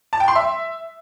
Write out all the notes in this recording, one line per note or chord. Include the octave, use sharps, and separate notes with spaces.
A5
G5
C6
E5